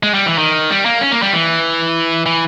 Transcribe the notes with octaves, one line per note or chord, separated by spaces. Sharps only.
G#3
G3
E3
D#3
G3
A#3
C#4
A#3
G3
E3
E3